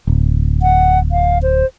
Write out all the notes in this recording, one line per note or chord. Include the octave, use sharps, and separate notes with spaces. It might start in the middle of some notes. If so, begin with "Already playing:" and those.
D1
F#5
F5
C5